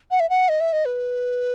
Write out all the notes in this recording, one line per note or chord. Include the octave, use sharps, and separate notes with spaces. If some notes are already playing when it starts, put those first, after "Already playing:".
F#5
E5
F#5
D#5
E5
D#5
B4